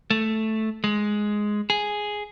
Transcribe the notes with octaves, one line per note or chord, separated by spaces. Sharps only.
A3
G#3
G#4